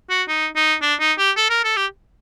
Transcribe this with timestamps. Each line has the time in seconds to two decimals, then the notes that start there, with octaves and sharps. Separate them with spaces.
0.10 F#4
0.28 D#4
0.55 D#4
0.82 D4
1.00 D#4
1.18 G4
1.36 A4
1.50 A#4
1.64 A4
1.76 G4